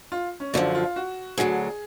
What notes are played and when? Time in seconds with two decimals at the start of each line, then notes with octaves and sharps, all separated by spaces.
0.12 F4
0.40 C#4
0.53 F#2 D3 F3 D4
0.75 F4
0.96 F#4
1.38 D2 D3 F#3 G#4